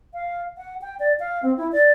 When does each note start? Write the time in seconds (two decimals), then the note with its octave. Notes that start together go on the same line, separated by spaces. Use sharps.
0.14 F5
0.57 F#5
0.82 G5
1.00 D5
1.20 F5
1.43 C4
1.57 E4
1.72 D5